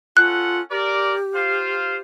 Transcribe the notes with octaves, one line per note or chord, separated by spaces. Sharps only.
C#4 F4 A4 F#5 F#6
G4 A#4 D5
F4 C5 F5